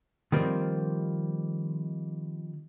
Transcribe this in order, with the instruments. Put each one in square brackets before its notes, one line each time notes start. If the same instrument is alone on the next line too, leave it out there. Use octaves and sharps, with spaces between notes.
[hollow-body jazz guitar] D#3 F3 G3 A#3 C4